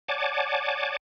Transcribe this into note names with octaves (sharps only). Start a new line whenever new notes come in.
C#5 D5 F#5 G#5 A5 D6